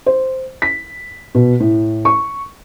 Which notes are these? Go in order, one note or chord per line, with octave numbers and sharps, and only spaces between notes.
C5
B6
B2
A2
C#6